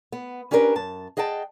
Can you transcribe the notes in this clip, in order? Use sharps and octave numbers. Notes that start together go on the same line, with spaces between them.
B3
C#4 D4 G4 G#4 A#4 B4
F#2 A5
G#4 D#5 F#5 G5 A5